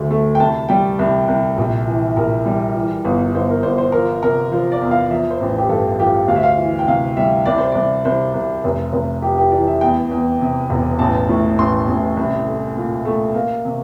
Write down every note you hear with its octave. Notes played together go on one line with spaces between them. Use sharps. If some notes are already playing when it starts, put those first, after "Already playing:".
Already playing: D2 D3 A3
A3
G5
C2 A5
G3 G5
C2
C2
A#1
E3
A#1 A#4
G3
E3
G1
G1 C5
A#4
G1 C5
C5
F3 A#4
C3 A#4
F3 C5
D5
E2
F5
F3 E5
C5
A1
G4
G2 A4
F3 G4
D2 F5
E5
F5
E3
G5
C3 F5
G3 E5
C2 D5
C5
C2 D5
C2 C5
C2
F1
F1
F2 G4
G4
E3 D5
E5
E2 G5
E2
C3
E1
A1 A5
A2
A1 C6
A1
C2
A3
A#2
A3
A#3
C3